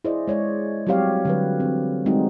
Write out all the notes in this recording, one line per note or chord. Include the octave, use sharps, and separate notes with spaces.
E4 G#4 C5 D5 D#5
G#3 C#5 D5
F#3 G3 C4 G4 C#5 F5
D3 F#3 B4
E3 C4
G3 G#3 C4 D#4 F#4